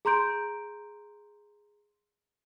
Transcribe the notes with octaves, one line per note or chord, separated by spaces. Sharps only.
G#4 A#5 C6 G6 D7